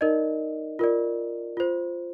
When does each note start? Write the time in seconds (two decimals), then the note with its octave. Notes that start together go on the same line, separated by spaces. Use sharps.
0.01 D#4 A#4 D5 D#5
0.79 F4 A#4 D5
1.57 F4 C5